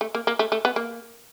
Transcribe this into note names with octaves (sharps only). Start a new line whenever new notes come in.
A3
A#3
A#3
A3
A3
B3
A#3